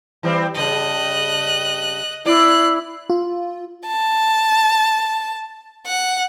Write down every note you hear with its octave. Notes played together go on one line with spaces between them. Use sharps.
E3 G3 C4
G2 C#3 D#5 F#6
C4 E4 D5 F#6 C7
F4
A5
F#5